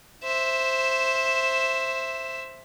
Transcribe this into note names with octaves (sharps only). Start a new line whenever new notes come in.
C5 E5